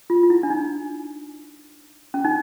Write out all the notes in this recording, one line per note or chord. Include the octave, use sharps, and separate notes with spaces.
F4
F4
E4
D4
D#4
C#4
D#4